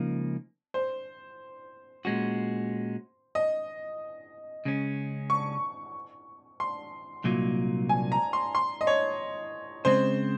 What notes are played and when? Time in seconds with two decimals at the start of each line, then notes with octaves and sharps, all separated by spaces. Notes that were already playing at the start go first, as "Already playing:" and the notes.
Already playing: C#2 C#3 F3 A#3 D#4
0.74 C5
2.05 A#2 G#3 C#4 F#4
3.35 D#5
4.65 C#3 G#3 C#4
5.30 C#6
6.60 C6
7.24 C2 A#2 F#3 A#3 D#4
7.89 G#5
8.12 A#5
8.33 C6
8.55 C6
8.81 D#5
8.87 C#5
9.85 C#3 G#3 C4 C5